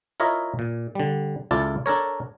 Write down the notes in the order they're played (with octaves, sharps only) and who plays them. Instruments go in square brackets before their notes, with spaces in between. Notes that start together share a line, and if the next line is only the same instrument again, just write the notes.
[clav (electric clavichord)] E4 F4 A#4 C#5 D#5 E5
A#2
D3 G3
C#2 E4 F4 A4 D5 A5
D4 A4 A#4 C#5